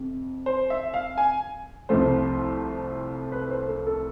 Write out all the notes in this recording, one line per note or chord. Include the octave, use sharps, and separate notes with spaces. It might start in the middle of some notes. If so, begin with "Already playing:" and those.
Already playing: F2 C3
C5
E5
F5
G#5
C2 C3 F3 A3 C5
B4
C5
A4
A4